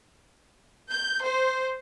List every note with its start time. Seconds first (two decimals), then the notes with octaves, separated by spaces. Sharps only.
0.89 G6
1.23 C5